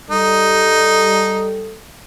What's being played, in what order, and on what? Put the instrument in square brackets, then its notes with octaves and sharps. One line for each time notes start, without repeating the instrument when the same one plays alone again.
[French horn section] G3 A4 [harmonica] D#4